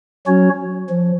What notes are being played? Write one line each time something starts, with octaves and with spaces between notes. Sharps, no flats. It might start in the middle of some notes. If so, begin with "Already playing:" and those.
F#3 C#4 F#4 C#5
F3